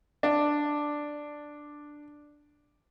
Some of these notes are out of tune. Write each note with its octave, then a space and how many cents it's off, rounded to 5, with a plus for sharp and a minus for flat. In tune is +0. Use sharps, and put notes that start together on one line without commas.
D4 +5